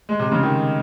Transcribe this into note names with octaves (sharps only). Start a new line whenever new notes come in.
G#3
C3
C#3
D#3